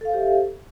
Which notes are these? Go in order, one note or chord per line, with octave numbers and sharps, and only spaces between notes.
G4 A4 C5 E5 F5